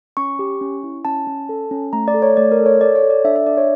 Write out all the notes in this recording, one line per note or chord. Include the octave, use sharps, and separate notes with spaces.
C#4 C#6
G4
C#4
E4
C#4 A5
C#4
A4
C#4
A3 A#5
D5
A4
C#5
A3 D5
A#4
A4
C#5
A4 D5
C#5
A4
D5
D4 E5
E5
D4 D5
C#5